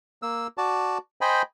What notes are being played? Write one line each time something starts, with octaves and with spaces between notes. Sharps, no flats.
A#3 E6
F#4 D5 A5
C5 D#5 G5 G#5 B5